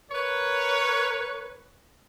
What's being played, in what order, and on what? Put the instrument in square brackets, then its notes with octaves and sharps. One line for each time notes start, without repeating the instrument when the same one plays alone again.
[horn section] A#4 B4 C#5